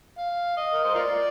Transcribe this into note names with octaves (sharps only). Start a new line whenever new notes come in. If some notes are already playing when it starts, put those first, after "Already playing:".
F5
D#5
A#4
C5
F4 A#4 D5